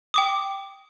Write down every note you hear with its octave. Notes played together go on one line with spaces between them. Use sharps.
G5 D6 D#6